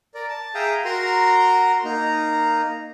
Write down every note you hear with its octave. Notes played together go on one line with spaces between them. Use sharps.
A#4 D5
A5
G#4 E5 F5 G5 A#5 D#6
F#4 A#4 A#5 C6
A#3 D#4 A#5